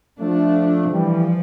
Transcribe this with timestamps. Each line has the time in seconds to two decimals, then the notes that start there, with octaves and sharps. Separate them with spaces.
0.21 F3 A3 D4
0.92 E3 F3 G3